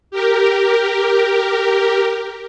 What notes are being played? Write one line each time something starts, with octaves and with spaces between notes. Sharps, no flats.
G4 A#4